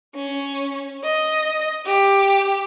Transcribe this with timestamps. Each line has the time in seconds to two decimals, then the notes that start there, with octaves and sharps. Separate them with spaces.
0.15 C#4
1.04 D#5
1.86 G4